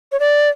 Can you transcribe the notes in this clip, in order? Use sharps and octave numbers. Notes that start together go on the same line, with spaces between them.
C#5
D5